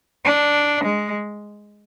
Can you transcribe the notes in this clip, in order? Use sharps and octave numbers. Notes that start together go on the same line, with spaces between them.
D4
G#3